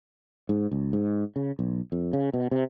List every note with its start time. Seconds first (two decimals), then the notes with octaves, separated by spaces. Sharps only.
0.49 G#2
0.71 C#2
0.93 G#2
1.36 C#3
1.59 B1
1.92 F2
2.13 C#3
2.33 B2
2.51 C3